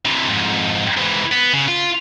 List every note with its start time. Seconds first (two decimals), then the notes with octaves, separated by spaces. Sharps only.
0.05 C3 E3
0.27 F2 G#2
0.97 G#2 E3
1.32 B3
1.53 C#3
1.68 F4